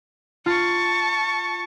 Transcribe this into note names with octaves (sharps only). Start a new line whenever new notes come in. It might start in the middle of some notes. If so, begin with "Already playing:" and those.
F4 A5 C#6